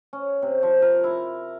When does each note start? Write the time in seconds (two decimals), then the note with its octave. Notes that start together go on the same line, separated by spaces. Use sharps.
0.13 C#4
0.42 C3
0.63 F3
0.82 A#4
1.04 E4